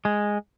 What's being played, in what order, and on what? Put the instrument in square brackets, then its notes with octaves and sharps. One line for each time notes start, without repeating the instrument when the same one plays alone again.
[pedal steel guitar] G#3